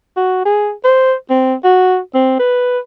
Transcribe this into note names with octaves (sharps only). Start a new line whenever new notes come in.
F#4
G#4
C5
C4
F#4
C4
B4